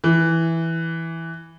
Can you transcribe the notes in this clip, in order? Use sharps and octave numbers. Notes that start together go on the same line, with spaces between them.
E3